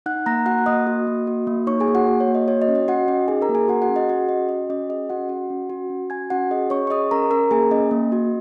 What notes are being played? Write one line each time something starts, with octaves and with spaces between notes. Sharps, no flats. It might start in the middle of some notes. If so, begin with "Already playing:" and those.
D#4 F#5 F#6
A#3 A#5 A#6
F#4 F#5 F#6
A#3 D#5 D#6
F#4
A#3
F#4
A#3
D#4 C#5 C#6
G#4 G#5
A#3
F#4 F#5
F#4
C#5
A#3
D#5
F#4 C#5
D#5
C#4
D#5
F#4 F#5
C#4 D#5
D#4 G#4 G#5
A#4 A#5
A#3
G#4 G#5
F#4 G#4 F#5
F#4 F#5
C#4
D#5
F#4 G#4 F#5
C#4 D#5
F#4 D#5
C#4 D#5
G#4 D#5
C#4 F#4 F#5
F#4
C#4
F#4
C#4
F#4 G#5 G#6
C#4 F#4 F#5
G#4 D#5
C#4 C#5 C#6
C#6
G#4 D#5 D#6
C#4 A#4 A#5
C#4 A#4 A#5
A#3 G#4 G#5
C#4 D#5
A#3
F#4